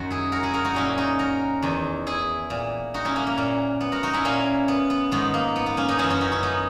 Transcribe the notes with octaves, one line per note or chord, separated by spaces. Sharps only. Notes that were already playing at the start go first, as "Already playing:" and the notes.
Already playing: F#2 D#3 F#4
E4 G#4
F#4 A#4
E4 G#4
F#4 A#4
D#4 F#4
A#2 C#4 E4
D#4 F#4
F#4 A#4
E2 D#3
E4 G#4
A#2
D#4 F#4
C#4 E4
A#3 C#4
A#3
A#2 A#3
B3
F#4 A#4
D#4 F#4
C#4 E4
A#2 A#3 C#4
B3
B3
G#2 D#3 B3
A#3
B3
B3
A#3 C#4
B3 D#4
F#2 E3 C#4 E4
C#4 E4
D#4 F#4
C#4 E4
B3 D#4